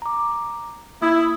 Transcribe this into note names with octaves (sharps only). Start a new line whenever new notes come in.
A#5 D6
A#3 E4 D#6 G#6